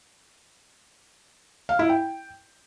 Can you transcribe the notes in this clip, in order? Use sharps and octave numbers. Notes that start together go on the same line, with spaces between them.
F5
E4
G5